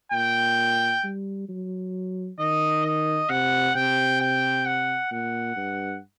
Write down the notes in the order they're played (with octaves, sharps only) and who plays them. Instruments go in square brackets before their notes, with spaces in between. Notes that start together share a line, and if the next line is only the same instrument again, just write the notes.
[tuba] A#2 [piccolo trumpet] G5
[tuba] G3
F#3
[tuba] D#3 [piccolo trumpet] D#5
[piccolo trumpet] D#5
[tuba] C3 [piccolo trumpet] F#5
[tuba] C3 [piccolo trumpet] G5
[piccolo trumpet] G5
F#5
[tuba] A#2 [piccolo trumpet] F#5
[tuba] G2